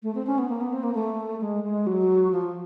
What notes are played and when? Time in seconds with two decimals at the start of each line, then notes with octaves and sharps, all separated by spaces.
0.03 A3
0.15 C4
0.26 C#4
0.38 B3
0.49 A#3
0.60 B3
0.72 C4
0.83 A#3
0.94 A3
1.41 G#3
1.64 G#3
1.87 F#3
2.32 F3